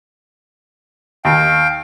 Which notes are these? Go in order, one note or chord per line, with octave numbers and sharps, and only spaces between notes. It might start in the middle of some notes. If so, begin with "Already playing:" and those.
D#2 F5 G5